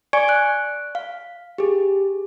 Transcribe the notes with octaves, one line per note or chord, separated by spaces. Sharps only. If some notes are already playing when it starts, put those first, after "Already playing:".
D5 G#5 C#6 G#6 C#7 D7
F#6 D7
F5
G4 G#4